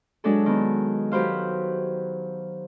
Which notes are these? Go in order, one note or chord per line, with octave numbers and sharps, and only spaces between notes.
F#3 G#3 D4 A4
D#3 B3
F#3 G4 B4 C5 F5